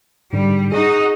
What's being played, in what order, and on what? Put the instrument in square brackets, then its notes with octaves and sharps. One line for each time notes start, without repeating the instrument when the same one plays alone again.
[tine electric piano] G#2 D3 [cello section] G3
[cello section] D#4 F#4 D#5 [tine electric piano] G#4